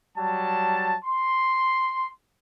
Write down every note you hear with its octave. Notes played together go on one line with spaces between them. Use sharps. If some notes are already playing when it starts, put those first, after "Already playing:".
F#3 G3 A5
C6